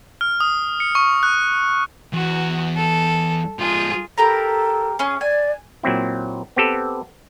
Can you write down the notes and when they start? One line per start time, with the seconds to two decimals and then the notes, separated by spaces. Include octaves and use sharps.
0.21 F6
0.40 D#6
0.80 C#7
0.95 C#6
1.23 F#6
2.13 E2 F#4
2.76 A4
3.59 F3 G#3 F4 G#4
4.18 G4 A4 A#4 A#5
4.99 C#4 G#4 G#5
5.21 D5 G#5
5.83 A#2 F#3 C4 E4
6.56 B3 C4 G4 A4 B4